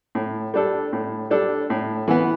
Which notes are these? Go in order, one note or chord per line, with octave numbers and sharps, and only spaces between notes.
A2
G3 D4 A4
A2
G3 D4 A4
A2
E3 B3